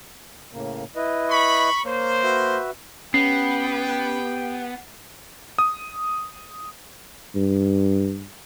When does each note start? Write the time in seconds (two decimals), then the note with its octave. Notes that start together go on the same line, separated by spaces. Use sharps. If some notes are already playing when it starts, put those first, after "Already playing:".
0.53 A2 C#3 A#3
0.96 E4 B4 D#5
1.30 B5 C#6
1.85 A#3 C5 C#5
2.23 F#4 B4 E5
3.14 B3 C#4 G4 G5 C7
5.59 D#6
7.35 G2